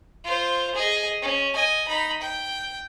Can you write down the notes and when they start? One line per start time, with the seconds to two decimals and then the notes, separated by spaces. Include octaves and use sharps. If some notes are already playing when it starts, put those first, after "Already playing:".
0.25 F4 C5
0.75 G#4 D#5
1.22 C#4
1.54 D#5 G#5
1.88 D#4 B5
2.21 G5